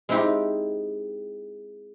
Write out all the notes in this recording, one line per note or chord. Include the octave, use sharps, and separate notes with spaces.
G#3 C4 D#4 E4 G4